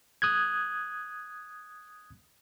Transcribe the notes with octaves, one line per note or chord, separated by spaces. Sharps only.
D#6 F#6 G#6